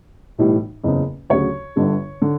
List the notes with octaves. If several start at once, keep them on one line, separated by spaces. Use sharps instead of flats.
B1 A2 E3 G3
F#1 E2 C#3
D2 C#3 F#3 C#5
G1 G2 D3 G3
D3